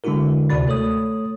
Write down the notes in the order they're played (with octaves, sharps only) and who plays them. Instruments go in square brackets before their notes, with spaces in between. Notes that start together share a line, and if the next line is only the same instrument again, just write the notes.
[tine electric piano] D3 G#3 D4 E4 F#4 A#4
D2 C3 F#4 D5 B5 A6
A3 A4 C#5 D#6